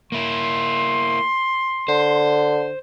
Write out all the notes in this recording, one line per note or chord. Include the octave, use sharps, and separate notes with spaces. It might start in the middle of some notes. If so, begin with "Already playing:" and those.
A#3 E4 C6
D3 C5